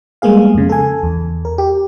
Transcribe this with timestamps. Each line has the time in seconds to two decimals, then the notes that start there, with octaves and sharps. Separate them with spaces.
0.22 G3 G#3 A#3 B3 G#4 F5
0.54 F2 C#3
0.69 A4 G#5
1.03 E2
1.45 A#4
1.58 G4